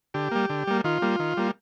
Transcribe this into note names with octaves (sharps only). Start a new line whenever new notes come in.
D3 G4
G3 A#3
D3
G3 A#3
D#3 F4
G3 A#3
D#3
G3 A#3